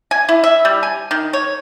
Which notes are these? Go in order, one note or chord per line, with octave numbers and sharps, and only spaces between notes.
G#5
E4
E5
G3
G#5
D#3
C#5